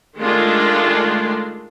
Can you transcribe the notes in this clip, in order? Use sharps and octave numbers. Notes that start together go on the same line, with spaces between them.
D#3 G#3 A3 D4 F4